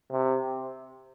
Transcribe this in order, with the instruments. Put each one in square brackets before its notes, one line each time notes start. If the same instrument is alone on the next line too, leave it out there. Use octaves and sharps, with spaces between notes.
[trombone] C3